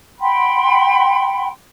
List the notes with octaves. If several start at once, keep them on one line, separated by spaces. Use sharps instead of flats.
F#5 G5 B5 C6